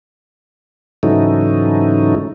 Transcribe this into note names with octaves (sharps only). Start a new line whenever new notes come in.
G#2 C#3 E3 F#3 A3 D#4